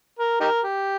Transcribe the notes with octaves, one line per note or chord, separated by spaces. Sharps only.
A#4
D#4 G4 A#4
G4